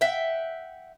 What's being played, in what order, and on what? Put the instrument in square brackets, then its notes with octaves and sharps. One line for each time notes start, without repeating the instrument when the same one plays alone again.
[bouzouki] E5 F#5 G5